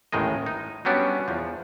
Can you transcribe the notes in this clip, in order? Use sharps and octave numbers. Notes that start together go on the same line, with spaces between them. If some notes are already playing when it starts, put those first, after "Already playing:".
A1 D#2 A2 D#3 G#3 D#5
D#4
F#3 G3 B3 C#4 D4
E2 F3